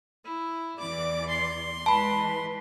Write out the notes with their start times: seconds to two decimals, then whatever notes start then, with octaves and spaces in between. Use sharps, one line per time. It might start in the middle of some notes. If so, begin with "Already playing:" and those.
0.25 E4
0.80 E2 E3 D5 D6
1.29 C6
1.86 E3 G#3 B4 A5 B5